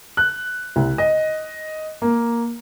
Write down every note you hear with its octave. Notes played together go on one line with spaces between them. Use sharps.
F#6
C2
D#5
A#3